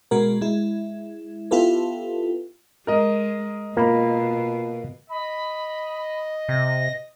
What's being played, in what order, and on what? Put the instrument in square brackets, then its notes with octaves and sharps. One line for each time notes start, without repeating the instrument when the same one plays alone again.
[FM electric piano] B2 G#3 F#4 A#4
G#3 E4
B3 E4 F4 G4 A4 B4
[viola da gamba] G#3 [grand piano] A#4 D#5
[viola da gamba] B2 [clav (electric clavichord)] A#3 [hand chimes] F4 B5
[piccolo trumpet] D#5 [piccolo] B5
[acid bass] C3 [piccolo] A#6